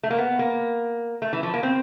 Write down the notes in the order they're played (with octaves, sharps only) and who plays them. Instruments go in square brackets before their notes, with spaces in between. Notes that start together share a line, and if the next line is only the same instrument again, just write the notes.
[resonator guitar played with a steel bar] A3
A#3
B3
A#3
A3
E3
F3
A#3
C4